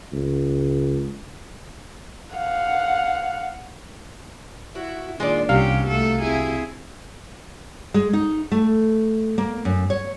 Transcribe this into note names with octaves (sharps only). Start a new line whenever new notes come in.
C#2
F5 F#5
E4 F#4
A#2 D#3 G#3 D4 F4 D5
C2 C3 C#4 F#4 G4 F5
A3 A4
C4 E4 G#4
G#3
D#4
A3
A#3
F#2
C#5